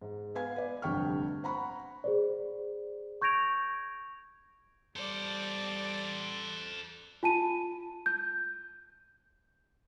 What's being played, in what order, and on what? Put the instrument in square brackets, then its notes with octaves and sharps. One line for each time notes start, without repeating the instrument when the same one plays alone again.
[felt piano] G#2
B3 B4 F5 G#5 G#6
B4 D5
F1 G2 D3 G5 C#6 F6
C5 F#5 A#5 B5 C#6
[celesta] G#4 C5 D5
C#6 G6 G#6 A#6 D7 F7
[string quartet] G3 D5 [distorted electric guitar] A4 C5
[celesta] F4 G#5 A5 D#7
G6